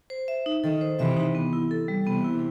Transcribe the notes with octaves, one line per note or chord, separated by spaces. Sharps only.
C5
E5
D#4
D#3 A4
C5
C3 E3 E5
D#4
B3
E4
A4
G3
C3 E3 B3
E4